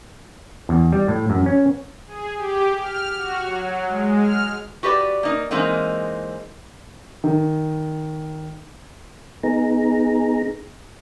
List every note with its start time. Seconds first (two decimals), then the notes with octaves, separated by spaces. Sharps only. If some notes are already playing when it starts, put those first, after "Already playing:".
0.69 E2
0.92 G3
1.08 A2
1.30 F#2
1.46 C#4
2.06 G#4
2.37 G4
2.79 F6
3.16 F#4
3.45 F#3
3.87 G#3
4.21 F6
4.83 F#4 G4 B4 D5
5.23 A#3 D#4
5.51 E3 G#3 A#3 C4 D#4
7.24 D#3
9.43 B3 D#4 G#4 A#5